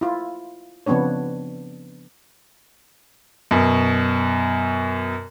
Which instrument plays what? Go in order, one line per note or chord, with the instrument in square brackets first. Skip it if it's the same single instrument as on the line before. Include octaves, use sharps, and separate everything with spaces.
[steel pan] E4 F4
C#3 F3 B3 C4 D4 C#5
[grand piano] F#2 B2